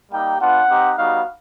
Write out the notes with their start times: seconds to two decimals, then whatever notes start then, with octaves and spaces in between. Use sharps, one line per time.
0.12 G3 A#3 D#4 G4 G5
0.40 B3 D4 F4 F#5
0.69 C4 D#4 G4
0.98 G3 B3 D#4 F#4 F5